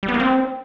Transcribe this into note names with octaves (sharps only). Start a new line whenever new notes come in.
G3
B3
A#3
C4